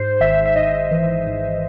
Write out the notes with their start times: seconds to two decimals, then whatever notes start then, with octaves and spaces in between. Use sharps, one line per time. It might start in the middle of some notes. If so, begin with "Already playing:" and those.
Already playing: G#2 C5
0.21 G#1 E5
0.46 E5
0.56 G#2 D#5
0.91 E3
1.27 G#2